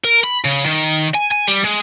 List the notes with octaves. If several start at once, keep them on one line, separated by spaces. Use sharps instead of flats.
A#4
B5
C#3
D#3
G#5
G#5
G3
G#3